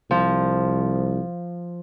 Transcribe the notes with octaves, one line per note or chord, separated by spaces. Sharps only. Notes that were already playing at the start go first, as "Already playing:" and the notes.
C2 F3